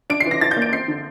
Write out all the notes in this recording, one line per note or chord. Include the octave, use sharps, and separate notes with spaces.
D4 D7
C7
E3
A#6
E3 A6
G6
A#3
D7
C4 C7
D3